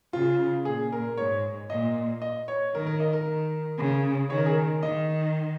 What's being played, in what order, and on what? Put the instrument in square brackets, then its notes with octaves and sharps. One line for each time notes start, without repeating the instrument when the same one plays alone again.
[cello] C#3 [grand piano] F4
[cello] A#2 [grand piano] G#4
[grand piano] A#4
[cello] G#2 [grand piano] C#5
[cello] A#2 [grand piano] D#5
[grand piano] D#5
C#5
[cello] D#3 [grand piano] A#4
[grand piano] A#4
D#5
A#4
[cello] D#3
C#3
[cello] D#3 [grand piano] C#5
[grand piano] A#4
G#4
A#4
[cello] D#3 [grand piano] D#5